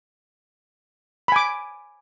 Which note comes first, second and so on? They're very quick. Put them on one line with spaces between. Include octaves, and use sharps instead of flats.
B5 G#5 D6